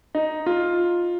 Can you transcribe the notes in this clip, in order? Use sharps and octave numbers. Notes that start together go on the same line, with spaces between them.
D#4
F4